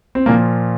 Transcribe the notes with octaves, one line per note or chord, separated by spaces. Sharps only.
C4
A#2 F3 A#3